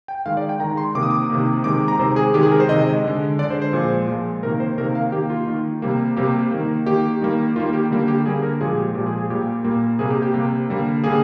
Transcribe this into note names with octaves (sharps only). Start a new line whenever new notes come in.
G5
D#3 G#3 F5
D5
G5
D#3 G#3 A#5
C6
C3 D#3 A#3 D6
D#6
D6
C3 D#3 A#3
C3 D#3 G#3 D6
A#5
C3 D#3 G#3 C5
G#4
C3 D#3 G#3 G4
G#4
A#4
C5
C3 D#3 G#3 D#5
D3 G#3
D3 G#3 D5
C5
C5
A#2 F3 G#3
A#2 F3 G#3
C3 D#3 A#3 A#4
C5
C3 D#3 A#3 A#4
F5
D#3 A#3 G4
F4
D#3 A#3
C3 G3 A#3
C3 G3 A#3 G4
D#3 A#3
D#3 A#3 G4
D#3 G3 A#3
D#3 G3 A#3 F4
G4
D3 G3 A#3
G4
D3 G3 A#3 G#4
A#4
A#2 F3 G#3 G#4
G4
A#2 F3 G#3 G4
G#4
G#4
A#2 G3 A#3 G4
A#2 G3 A#3
C3 G3 A#3 G#4
G4
G4
C3 G3 A#3
D3 G3 A#3
D3 G3 A#3 G#4